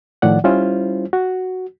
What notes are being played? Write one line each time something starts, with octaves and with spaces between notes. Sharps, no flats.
A2 D#3 F3 D5 F#5
G3 C#4 E4 F4 C5
F#4